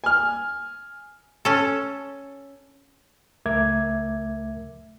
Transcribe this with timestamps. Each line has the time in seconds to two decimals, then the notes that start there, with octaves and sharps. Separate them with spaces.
0.04 G#5 F6
1.45 C#4 A4
3.46 C#2 A3 A#4 E5 D6 G#6